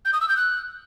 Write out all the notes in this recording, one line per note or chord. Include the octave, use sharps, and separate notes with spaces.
G6
D#6
E6
G6
F#6